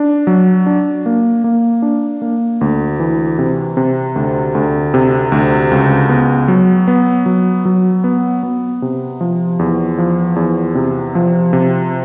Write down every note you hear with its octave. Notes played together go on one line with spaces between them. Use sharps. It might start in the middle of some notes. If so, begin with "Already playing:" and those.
Already playing: D4
F#3
D4
A#3
A#3
D4
A#3
D2
E3
C3
C3
D2
D2
C3
D2
C#2
B3
F#3
B3
F#3
F#3
B3
B3
C3
F3
E2
F3
E2
C3
F3
C3